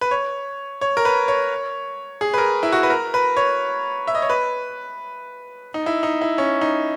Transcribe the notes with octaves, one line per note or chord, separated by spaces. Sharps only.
B4
C#5
C#5
A#4
B4
C#5
G#4
B4
A#4
E4
F#4
B4
A#4
B4
C#5
E5
D#5
C#5
B4
D#4
E4
D#4
E4
C#4
D#4